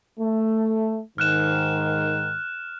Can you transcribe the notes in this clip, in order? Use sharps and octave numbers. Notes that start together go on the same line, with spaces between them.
A3
G#2 D#3 F6 F#6 E7